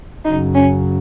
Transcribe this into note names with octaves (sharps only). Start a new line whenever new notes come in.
F#2 C#3 F#3 D#4
C#4